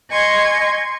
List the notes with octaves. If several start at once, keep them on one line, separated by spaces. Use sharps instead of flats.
D#5 G#5 C6 C#6 G#6